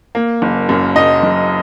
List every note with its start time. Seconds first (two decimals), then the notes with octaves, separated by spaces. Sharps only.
0.15 A#3
0.42 F#1
0.69 F#2
0.96 F#1 D#5
1.23 F#1